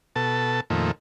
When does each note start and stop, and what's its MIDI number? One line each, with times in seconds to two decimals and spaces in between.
0.16 0.60 47
0.16 0.60 69
0.16 0.60 81
0.70 0.91 41
0.70 0.91 46
0.70 0.91 51
0.70 0.91 57